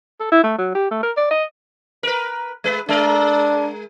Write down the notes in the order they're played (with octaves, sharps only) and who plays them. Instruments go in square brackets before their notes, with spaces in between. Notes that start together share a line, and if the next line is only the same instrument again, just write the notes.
[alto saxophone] A4
E4
A3
F#3
G4
A3
A#4
D5
D#5
[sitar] A#4 B4
G#3 B4
[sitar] G#3 A#4 [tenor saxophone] D4